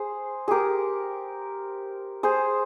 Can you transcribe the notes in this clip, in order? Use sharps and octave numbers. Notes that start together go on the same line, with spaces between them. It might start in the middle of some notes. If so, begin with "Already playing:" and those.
Already playing: G#4 C5
G4 G#4 A#4
G#4 C5